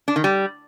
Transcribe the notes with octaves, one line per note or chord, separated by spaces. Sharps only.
D4
D#3
G3